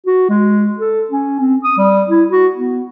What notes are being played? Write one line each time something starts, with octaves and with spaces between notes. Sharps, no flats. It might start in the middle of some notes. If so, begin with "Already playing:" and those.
F#4
G#3
A4
C#4
C4
D#6
G3
E4
F#4
B3